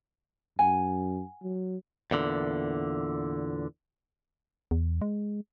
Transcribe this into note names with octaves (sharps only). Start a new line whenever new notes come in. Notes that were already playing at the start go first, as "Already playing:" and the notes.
F#2 F#5 G#5
F#3
E2 A#2 D3
E2
G#3